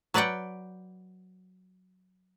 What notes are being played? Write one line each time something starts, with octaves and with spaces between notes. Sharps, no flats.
F#3 B4 D5 F#5 G5